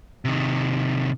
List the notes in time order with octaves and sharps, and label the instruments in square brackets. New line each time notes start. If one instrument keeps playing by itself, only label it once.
[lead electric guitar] C3 D#3